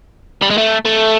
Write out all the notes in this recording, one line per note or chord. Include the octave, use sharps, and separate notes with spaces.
G3
G#3
A3
A3